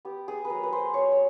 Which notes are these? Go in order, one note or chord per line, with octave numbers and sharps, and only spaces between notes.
B3 G4
B3 G#4
B4
F#3 A#4
B4
F#3 C5
B3 C#5
C#5